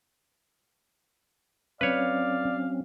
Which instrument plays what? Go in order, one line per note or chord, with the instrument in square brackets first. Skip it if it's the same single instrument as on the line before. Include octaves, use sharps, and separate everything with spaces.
[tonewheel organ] F#3 C4 C#4 [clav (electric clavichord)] B4 C#5 [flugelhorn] D5 [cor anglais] F5